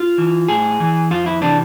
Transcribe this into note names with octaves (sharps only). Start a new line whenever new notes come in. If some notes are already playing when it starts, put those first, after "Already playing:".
Already playing: F4
E3
A2 G#4
E3
F2 F4
E4
C3 E3 D4